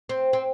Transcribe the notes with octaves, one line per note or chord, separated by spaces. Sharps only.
C4
C4